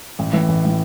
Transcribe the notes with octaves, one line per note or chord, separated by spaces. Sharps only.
A1
A2 E3
A1
A2 E3